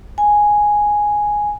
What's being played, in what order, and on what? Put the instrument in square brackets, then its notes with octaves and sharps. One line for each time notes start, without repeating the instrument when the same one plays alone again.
[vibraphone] G#5